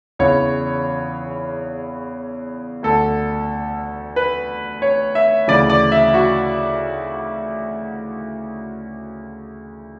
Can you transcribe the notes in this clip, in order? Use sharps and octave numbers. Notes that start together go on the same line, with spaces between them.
E2 C#3 E3 C#5
D2 D3 A4
B4
C#5
E5
D2 C#3 E3 D5
D5
E5
F#4